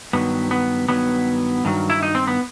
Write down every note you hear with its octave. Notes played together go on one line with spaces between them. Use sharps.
G2 D#3 F#3 B3
B3
G2 D#3 F#3 B3
G2 D#3 F#3
E4
D#4
C4
B3